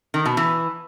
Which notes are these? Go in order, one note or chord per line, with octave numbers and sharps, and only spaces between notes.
D#3
B2
E3